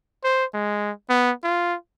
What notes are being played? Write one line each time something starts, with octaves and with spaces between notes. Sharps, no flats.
C5
G#3
B3
F4